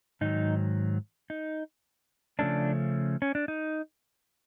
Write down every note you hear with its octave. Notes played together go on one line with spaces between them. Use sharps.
G#2 D#3 F#3 D#4
D#4
C#3 F3 A3 C#4 D4
C#4
D4
D#4